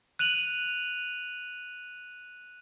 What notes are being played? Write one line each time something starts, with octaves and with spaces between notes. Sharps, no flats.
F#6 D#7 F7 F#7